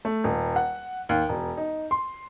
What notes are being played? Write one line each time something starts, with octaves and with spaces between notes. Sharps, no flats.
A3
D#1
F#5
D#2
E1
D#4
C6